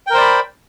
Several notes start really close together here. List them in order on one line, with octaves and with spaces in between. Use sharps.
G5 A#4 C5 D5 B5